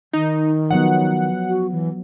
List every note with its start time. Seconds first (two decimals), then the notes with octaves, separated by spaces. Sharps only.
0.13 D#3 D#4
0.71 F3 F#3 B3 F#5
1.48 F#4
1.72 E3